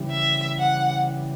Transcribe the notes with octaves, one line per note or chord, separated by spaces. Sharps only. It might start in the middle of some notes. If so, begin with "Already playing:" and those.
Already playing: C#3 E3 G3
E5
F#5